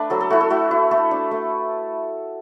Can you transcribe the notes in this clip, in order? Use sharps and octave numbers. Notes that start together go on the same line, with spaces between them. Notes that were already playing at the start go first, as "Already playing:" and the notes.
Already playing: A3 D4 B4
F#3 A4
A4
A3 E4 F#4
A4
A3 F#4
E4
A3 A4
D4
A3